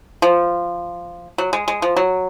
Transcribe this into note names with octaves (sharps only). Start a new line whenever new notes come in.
F3
F#3
G#3
G#3
F3
F#3